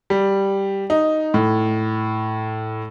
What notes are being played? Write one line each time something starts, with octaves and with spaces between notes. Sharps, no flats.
G3
D#4
A2